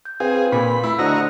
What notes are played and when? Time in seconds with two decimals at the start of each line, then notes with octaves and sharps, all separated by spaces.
0.05 G6
0.20 C4 F4 G#4 B4 F5
0.52 A#2 B5
0.83 A3 E4 E6
0.99 D3 F#4 C5 D#5 A#5 F6 F#6